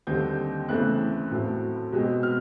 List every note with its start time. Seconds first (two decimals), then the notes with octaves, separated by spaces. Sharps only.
0.07 D#2 D3 G3 C4 G6
0.69 E2 C#3 E3 A3 C4 F#6
1.31 A2 F#3 A3 C4
1.92 B2 G#3 C4
2.23 F6